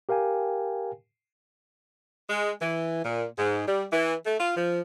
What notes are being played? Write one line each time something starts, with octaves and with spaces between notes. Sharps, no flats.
G4 A#4 F5 G5 G#5
G#3
E3
A#2
G#2
G3
E3
A3
F4
F3